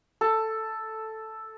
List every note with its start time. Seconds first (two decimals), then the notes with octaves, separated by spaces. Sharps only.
0.21 A4